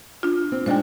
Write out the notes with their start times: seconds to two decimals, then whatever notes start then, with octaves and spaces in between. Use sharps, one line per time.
0.23 D4 F4
0.52 C4
0.66 G#3 D4 D#4 C5 G5